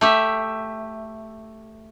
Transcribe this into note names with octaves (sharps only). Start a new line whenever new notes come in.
A3 G4 E5